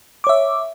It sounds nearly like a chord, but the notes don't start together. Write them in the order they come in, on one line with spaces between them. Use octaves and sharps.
D6 C#5 E5